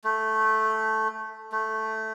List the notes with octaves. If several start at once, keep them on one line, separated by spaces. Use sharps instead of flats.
A3
A3